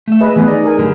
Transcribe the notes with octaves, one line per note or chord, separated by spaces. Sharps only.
A3 E5
G#4 B4 D#5
E3 A3 B3 G#4
D#4 D5
G#4 A#4 G#5
F#2 D3 G3 A3